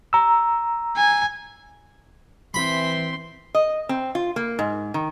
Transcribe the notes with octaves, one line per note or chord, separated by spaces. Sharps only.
A#5 E6
G#5
E3 C4 B5 C6 B6
D#5
C4
F4
A#3
G#2
D#3